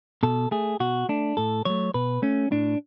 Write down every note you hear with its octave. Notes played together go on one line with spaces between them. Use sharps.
B2 A4
A3 G#4
B2 F#4
A3 D4
A2 A4
F#3 A3 C#5
B2 B4
A3 C#4
A2 D4